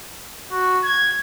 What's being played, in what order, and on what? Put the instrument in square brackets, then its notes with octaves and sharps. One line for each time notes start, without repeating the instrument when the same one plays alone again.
[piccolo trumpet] F#4
G#6